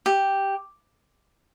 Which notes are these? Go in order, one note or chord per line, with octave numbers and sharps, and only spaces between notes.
G4